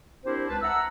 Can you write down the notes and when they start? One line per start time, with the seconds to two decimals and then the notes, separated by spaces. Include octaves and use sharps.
0.25 C4 D4 E4 G4 A#4 C5
0.49 C#2 B4 A5
0.62 E5 F#5 A#5 E6